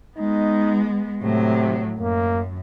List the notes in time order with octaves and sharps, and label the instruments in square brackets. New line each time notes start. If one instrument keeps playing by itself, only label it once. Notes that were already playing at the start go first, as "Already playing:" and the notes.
[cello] G#3 B3 [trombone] D#4
[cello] A2 F#3 [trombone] C3
[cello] F#2 [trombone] A#3